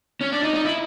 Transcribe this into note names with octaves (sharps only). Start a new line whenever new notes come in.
C#4
D4
D#4
D#4
E4